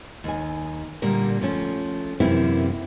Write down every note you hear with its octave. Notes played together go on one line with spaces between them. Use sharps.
D#2 G#5
A#2 D3 G3 A#3 A#4
F3 A3 C#4
F#2 C3 E3 A#3 C4 E4